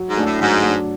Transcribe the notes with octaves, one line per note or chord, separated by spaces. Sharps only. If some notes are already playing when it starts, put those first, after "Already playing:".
Already playing: F#3
G#2
A3 D4
A2
G#2 F#3
A3 D4